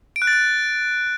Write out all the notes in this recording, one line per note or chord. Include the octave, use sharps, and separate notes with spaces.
D7
F#6
A6
F#6